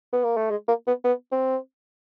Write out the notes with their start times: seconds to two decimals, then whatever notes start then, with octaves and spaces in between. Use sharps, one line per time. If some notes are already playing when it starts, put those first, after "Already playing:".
0.13 B3
0.24 A#3
0.37 A3
0.51 G#3
0.68 A#3
0.87 B3
1.04 B3
1.32 C4